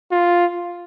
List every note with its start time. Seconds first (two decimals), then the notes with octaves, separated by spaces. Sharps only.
0.12 F4